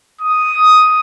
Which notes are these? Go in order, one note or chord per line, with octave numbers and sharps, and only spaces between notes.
D#6